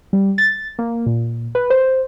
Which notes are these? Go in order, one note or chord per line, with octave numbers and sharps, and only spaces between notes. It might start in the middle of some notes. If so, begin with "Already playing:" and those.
G3
A6
A#3
A#2
B4
C5